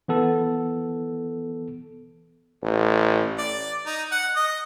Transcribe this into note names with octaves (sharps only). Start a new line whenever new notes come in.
E3 B3 A4
A1
D5
D#4
F#5
D#5